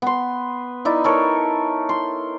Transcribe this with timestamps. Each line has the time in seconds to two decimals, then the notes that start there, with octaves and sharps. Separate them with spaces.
0.02 B3 C6
0.85 D#4 E4 D5
1.04 A4 A#4 C#5
1.89 C6